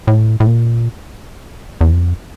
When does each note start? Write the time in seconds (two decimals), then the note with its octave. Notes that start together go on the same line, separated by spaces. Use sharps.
0.07 A2
0.40 A2
0.47 A#2
1.81 E2
1.91 F2